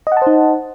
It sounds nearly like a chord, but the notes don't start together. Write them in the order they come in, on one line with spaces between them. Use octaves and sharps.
D#5 F#5 A5 C5 D#4